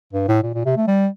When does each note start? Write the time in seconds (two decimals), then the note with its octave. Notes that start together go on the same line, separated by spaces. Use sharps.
0.13 G2
0.28 A2
0.43 A#2
0.54 A#2
0.65 C3
0.77 A3
0.87 G3